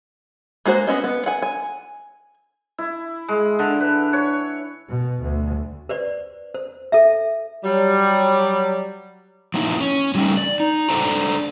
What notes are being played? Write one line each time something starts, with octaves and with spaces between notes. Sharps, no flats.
G#3 A#3 F#4 C5
B3 C#4 D#5
B3
F#5 G#5
G#5
E4
G#3
D3
B4
C#5
B2
D2
B4 C5 D5
C5
A4 E5
F#3 G3
F3 A#3 D#4 E4
C#4
F#3 G3 A3 C#4 D#4
D5
D#4
D4 A4 C5 D5 A#5